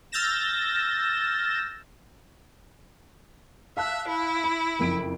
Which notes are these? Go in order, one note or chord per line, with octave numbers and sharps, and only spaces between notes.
E6 F6 G6 A6 A#6 E7
E5 F5 A5 F#6
E4
B5
F#1 F2 D7